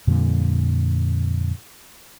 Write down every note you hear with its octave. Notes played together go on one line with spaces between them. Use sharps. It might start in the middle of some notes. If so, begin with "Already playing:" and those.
F2 A#2 D3 G3